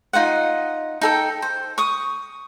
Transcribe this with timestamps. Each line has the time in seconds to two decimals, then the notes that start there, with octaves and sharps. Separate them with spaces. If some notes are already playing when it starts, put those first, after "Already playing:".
0.13 D#4 F4 D#5 F#5
1.01 D#4 A4 G5
1.42 C5
1.78 C#6 D#6